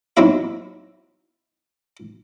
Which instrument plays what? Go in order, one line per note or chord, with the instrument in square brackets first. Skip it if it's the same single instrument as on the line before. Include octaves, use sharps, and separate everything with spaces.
[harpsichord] F#3 C4 D#4 E4 E5